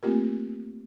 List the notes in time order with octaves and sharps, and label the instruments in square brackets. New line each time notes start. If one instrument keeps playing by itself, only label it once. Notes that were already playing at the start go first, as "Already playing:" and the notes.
[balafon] A3 A#3 C4 F4 G4 A#4